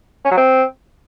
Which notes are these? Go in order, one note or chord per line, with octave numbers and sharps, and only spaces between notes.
C#4
F#3
C4